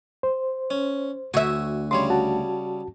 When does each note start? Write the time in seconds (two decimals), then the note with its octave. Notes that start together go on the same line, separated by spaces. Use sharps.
0.23 C5
0.70 C#4
1.34 D2 F#4 E5 G#5
1.91 C#3 G3 C#5 C6
2.10 F#4 A5